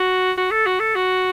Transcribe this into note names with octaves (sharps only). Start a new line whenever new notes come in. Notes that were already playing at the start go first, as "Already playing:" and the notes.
Already playing: F#4
F#4
A4
F#4
A4
F#4